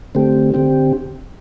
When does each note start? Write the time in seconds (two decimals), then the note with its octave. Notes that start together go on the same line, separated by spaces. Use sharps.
0.15 D3 A3 C4 G4
0.54 D3 C4 G4